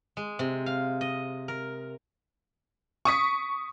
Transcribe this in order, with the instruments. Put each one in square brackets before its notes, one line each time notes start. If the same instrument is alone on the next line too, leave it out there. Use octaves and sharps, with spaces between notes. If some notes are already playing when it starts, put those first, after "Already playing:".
[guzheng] G#3
C3
F5
D#5
A#4
[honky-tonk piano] C#6 D#6 B6